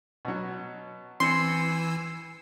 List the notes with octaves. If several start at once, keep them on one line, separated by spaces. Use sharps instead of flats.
B2 F#3
E3 C4 G#5 C6 E6 C7 C#7